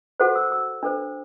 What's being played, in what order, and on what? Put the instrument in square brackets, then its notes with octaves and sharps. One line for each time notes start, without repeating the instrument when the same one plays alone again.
[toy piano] F#4 A4 C5 F#5
E6
E6
D4 A4 C5